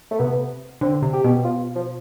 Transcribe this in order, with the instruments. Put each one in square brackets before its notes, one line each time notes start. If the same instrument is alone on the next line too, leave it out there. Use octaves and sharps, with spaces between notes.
[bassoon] A3
[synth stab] C3 [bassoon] B3
[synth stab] D3 [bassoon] C4
[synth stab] C3
[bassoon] G4
[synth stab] B2
[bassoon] F4
F3